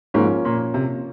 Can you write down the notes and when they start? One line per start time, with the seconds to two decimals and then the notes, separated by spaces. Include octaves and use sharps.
0.14 G#2 F3 A#3 C#4
0.45 A#2
0.74 C3